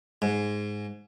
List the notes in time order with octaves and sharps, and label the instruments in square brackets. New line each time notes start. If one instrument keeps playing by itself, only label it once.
[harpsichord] G#2